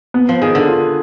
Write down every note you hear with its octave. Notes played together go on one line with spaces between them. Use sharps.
B3
F3
D#3 G#4
D3
F4